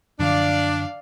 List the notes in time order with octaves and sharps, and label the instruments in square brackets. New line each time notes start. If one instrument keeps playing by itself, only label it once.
[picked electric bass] F#2 D3 F3 [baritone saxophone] D4 [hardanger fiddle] D5 F5